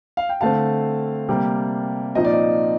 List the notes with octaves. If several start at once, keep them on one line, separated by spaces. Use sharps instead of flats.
F5
G5
D3 A3 C4 F5 A5
C3 G3 A#3
A#2 F3 C4 D#4 D#5
D5
D#5